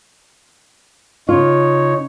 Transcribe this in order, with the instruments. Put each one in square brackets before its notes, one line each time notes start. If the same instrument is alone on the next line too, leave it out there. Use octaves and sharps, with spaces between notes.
[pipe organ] C#3 D#4 C#5 [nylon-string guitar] F4